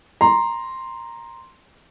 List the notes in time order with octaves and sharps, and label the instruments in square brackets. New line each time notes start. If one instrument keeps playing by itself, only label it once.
[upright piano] A#5 C6